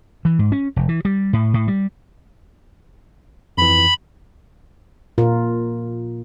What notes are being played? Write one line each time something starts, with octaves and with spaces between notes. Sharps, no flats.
E3
G#2
C#4
F1
E3
G3
A2
A2
G3
F2 E3 B5
A#2 F4 A#4